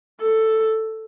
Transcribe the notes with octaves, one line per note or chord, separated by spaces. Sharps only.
A4